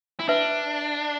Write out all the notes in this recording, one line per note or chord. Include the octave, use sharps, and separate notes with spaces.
E4
D4 B4 E5